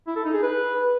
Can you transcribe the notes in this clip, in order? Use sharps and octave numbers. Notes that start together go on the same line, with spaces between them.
E4
A4
D#4
G#4
B4